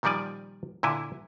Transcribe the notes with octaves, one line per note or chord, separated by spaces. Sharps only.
A#2 D#3 F3 G3 D5 G#5
A#2 D3 E4 G#5